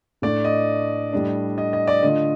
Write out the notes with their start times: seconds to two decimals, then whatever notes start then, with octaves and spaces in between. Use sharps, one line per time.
0.22 A2 A3 D4 D5
0.45 D#5
1.13 A2 G3 D4
1.58 D#5
1.73 D#5
1.87 D5
2.03 D3 A3 D4 F4 D#5